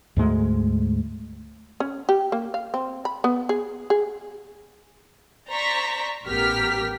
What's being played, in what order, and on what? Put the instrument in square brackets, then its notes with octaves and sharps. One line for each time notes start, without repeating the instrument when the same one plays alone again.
[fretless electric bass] D2 G#2 G#3 A3
[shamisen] C#4
G4
A#3
F5
C4
B5
B3
G#4
G#4
[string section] C5 D5 A#5 C#6 B6
A1 B3 G4 A#4 F6 B6